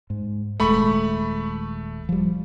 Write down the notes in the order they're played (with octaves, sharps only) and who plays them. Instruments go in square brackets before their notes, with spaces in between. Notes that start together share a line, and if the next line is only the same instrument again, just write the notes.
[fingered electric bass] G#2
[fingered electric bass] D#1 G#3 [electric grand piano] A3 B5 C#6
[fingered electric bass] F3 G3